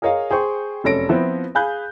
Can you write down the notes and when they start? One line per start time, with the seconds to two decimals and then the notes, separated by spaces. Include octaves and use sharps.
0.02 G#4 A#4 C#5 D#5 F5
0.30 G#4 C5 G5 C#6
0.84 F1 F#2 A4 C#5 A#6 D7
1.09 F3 B3 C4 E4 B4 C5
1.55 G#4 F5 G#5 B5 F#6 G6